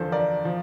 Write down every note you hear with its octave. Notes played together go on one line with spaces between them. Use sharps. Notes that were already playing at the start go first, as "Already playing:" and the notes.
Already playing: E2 D3 F3 A4 C5
A#4 D5
F3